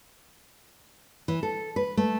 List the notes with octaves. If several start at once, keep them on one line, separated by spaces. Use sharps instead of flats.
E3
A4
B4
A3